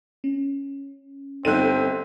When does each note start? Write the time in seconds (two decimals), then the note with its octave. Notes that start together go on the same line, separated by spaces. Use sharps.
0.24 C#4
1.45 G1 C4 D#4 A4 F#6 D#7